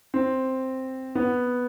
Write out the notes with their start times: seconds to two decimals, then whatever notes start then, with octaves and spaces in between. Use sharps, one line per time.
0.14 C4
1.15 B3